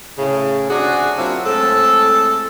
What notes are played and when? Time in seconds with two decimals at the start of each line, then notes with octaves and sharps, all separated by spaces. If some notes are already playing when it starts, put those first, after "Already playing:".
0.18 A2 C#3
0.70 C3 C#4 D4 F#4 G#4
1.17 F#3 A#3 C4 D4 E4 F4
1.45 A2 G#3 C4 A4